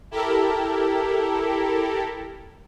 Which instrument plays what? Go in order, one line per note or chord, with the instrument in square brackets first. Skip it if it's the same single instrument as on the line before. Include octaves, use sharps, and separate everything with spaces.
[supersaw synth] E4 G4 A4 A#4